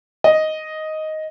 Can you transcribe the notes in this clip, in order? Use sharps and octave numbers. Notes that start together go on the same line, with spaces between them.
D#5